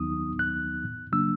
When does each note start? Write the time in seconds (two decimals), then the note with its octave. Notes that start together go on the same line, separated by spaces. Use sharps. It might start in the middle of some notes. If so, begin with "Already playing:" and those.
Already playing: D#2 D#3 F#3 B3 D#4 D#6
0.39 F#6
1.12 C#3 F#3 A#3 D4 E6